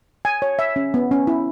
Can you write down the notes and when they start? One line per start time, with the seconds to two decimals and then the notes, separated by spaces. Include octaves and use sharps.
0.25 G#5
0.42 C#5
0.59 E5
0.76 C#4
0.94 B3
1.11 C#4
1.27 E4